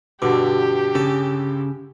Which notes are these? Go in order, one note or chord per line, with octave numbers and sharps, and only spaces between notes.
G2 B2 D3 G4 D6
C#3 A4